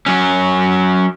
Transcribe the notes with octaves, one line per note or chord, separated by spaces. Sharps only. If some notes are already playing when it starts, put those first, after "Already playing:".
F#3 C#4